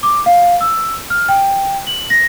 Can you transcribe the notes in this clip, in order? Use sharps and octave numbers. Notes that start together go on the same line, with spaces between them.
D6
F5
E6
F6
G5
F#7
A#6